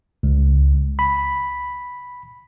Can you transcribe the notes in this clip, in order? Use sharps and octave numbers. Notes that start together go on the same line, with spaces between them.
C#2
B5